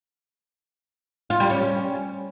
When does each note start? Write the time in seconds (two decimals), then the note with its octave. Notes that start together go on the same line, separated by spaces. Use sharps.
1.30 F4
1.40 G3
1.50 C#4